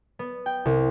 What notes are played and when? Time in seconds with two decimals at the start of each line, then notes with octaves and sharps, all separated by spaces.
0.19 B3
0.46 G5
0.65 C2